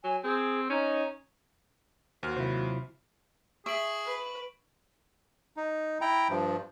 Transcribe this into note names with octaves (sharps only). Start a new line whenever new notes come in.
F#3 G#5
C4 G#4
C#4 D#4
D#2 F#4 C5 F6
C3 F#3 E4 F4 C5
G#4 E5 C#6 D7 F#7
B4
D#4
E4 G5 A#5
G2 F3